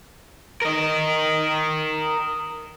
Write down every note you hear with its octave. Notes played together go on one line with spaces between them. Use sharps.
A#4 D#5